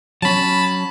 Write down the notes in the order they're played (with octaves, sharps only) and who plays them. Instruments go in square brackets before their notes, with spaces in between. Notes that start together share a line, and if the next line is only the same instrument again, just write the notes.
[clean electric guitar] F#3 C#4 [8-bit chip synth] A5 B5